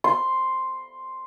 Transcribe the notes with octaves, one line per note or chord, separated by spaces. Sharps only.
C6